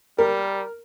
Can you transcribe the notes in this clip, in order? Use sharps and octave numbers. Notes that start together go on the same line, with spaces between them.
G3 A#4